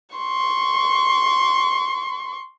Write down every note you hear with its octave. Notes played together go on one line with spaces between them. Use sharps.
C6 C#6